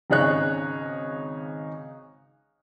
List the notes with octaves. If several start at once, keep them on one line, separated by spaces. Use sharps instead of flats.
G#1 C#3 D#4 G#4 C#5 F#6